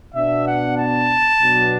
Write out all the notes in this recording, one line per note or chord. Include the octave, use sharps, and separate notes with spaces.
B2 B3 D4 E5
F#5
A5
B2 F#3 B3 D4